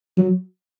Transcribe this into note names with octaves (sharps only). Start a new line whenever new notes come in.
F#3